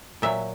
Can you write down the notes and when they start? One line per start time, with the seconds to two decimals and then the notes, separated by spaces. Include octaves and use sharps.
0.22 A#2 F#3 E5